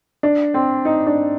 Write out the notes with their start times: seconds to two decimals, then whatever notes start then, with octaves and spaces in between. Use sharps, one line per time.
0.23 D4
0.54 C4
0.85 D#4
1.07 D4